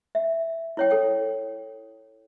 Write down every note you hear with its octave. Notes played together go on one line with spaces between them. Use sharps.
E5
E4 C#5 G5
A4 G5